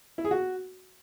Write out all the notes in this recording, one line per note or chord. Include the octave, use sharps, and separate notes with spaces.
E4
G#4
F#4